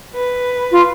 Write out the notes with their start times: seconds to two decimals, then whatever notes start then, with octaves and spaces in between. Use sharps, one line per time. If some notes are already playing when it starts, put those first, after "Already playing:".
0.14 B4
0.71 F4